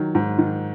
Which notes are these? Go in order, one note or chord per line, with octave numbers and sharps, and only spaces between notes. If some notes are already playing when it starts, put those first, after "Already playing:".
Already playing: D#3 F#3
G#2
D#3